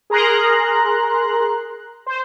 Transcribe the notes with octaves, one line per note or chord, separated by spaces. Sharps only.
G#4 A#4 A#5 C6 F#6
C5